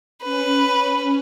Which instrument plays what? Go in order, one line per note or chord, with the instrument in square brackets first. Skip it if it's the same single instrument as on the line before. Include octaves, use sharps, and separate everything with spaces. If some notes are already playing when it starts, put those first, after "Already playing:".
[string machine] C#4 [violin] B4